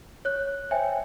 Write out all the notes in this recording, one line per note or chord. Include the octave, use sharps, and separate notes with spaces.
C#5 F#6
C5 C#5 E5 G5 G#5